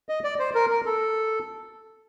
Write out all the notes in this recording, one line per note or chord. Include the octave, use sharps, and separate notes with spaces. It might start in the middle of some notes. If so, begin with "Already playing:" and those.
D#5
D5
C5
A#4
A#4
A4